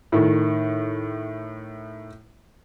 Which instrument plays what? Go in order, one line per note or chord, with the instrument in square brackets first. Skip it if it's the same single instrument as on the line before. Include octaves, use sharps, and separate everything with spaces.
[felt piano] A2 D#3